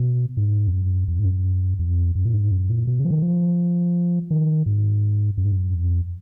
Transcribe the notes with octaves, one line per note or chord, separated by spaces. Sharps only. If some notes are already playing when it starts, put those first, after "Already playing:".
Already playing: B2
G#2
F2
F#2
F2
G#2
F#2
F2
F#2
A#2
G#2
F#2
A#2
B2
C#3
F3
D#3
F3
D#3
G#2
F#2
G#2
F#2
F2